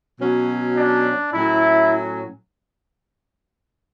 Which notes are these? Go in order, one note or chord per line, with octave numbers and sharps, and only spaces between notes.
B2 F#3 C#4
D4
A2 F#3 C#4 E4